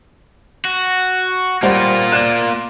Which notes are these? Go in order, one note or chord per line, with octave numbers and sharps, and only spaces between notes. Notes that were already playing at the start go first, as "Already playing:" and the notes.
F#4
G3 A#3 F4 C5 F#5
D5 F#6 E7